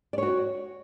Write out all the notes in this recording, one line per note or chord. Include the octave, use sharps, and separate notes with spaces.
F#4 C#5 D5